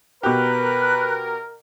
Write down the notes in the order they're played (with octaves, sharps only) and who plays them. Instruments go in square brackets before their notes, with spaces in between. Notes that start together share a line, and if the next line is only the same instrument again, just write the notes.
[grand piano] B2 G4 [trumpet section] A#4 [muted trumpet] B4 [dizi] F#6